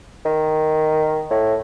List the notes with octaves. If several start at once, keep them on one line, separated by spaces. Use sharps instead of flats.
D#3
A2